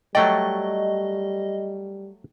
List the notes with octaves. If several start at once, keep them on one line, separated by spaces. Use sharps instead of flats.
F#3 G3 A3 D5 D#5 G5